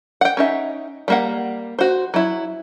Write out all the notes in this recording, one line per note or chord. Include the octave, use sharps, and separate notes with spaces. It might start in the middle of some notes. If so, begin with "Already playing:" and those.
F#5 G5
C#4 D#4 E5
G3 A#3 F#5
F#4 C5
F#3 E4